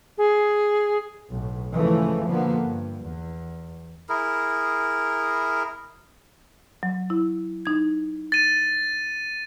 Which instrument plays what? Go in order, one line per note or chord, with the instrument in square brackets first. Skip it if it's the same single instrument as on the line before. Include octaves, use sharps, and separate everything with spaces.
[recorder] G#4
[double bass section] B1 A2
G#2 C#3 E3 F3 A3
B2 D3 F3 A#3 B3
G2
E2
[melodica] E4 G#4 A#4
[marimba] F#3
E4
D#4 G#6
[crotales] A6 D#7